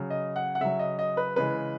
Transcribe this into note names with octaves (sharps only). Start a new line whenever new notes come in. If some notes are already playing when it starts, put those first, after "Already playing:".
Already playing: C#3 F#3
D#5
F#5
F#5
C#3 F#3 E5
D#5
D#5
B4
C#3 E3 G#3 B4